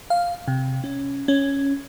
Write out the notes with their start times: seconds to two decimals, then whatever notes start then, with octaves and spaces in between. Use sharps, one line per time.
0.10 F5
0.48 C3
0.84 C#4
1.28 C#4